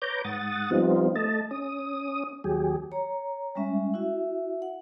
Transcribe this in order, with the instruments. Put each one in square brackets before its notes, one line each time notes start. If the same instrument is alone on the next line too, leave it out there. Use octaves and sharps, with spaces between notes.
[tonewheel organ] B4 C#5 A#5 D6 G6
G#2 F#5 D#6 A6
F3 G3 B3 C4 D#4 F4
A3 D#5 A5
C#4 D#6
D#2 F#3 G4 G#4
[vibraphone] C#5 A#5
G3 G#3 C#4 E5
E4 F#4 E5
F#5